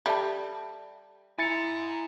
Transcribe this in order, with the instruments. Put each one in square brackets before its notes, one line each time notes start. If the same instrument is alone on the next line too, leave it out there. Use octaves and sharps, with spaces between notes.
[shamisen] G3 [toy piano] A4 E5 A5
[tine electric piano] E4 A6 C#7 [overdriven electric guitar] G#5 A#5